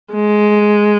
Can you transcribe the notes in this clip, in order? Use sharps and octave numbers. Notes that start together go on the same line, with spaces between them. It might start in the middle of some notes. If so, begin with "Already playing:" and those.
G#3